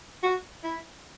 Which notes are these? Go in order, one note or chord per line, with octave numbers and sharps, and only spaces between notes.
F#4
E4